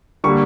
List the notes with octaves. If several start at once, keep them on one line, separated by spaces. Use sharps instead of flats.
D3 G3 A#3 C#6